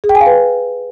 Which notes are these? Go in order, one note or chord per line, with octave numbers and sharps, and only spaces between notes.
G#4
G5
G#5
F5
B4